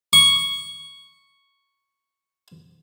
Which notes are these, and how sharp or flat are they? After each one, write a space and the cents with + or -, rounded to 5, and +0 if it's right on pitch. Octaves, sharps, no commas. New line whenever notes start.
C#6 +0